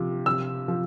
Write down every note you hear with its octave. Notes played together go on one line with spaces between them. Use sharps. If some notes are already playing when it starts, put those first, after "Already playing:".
Already playing: C3 F3
C3 E6
F3